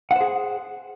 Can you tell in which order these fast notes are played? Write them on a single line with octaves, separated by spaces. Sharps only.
F#5 C5 G#4